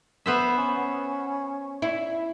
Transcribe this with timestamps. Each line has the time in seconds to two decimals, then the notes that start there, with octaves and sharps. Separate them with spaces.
0.26 B3 C5 E5
0.58 C#4
1.82 E4